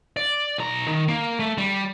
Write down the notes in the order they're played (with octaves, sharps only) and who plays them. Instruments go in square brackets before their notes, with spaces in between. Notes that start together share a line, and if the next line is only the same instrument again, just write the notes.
[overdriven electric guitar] D5
B1 A#5
D#3
A#3
A3
G3